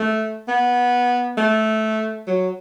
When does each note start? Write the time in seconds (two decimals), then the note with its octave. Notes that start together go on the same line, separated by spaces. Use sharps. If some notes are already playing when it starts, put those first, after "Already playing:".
Already playing: A3
0.48 B3
1.38 A3
2.27 F#3